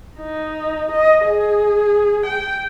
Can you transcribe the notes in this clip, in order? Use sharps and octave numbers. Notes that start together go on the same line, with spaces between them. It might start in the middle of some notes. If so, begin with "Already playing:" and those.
D#4
D#5
G#4
G5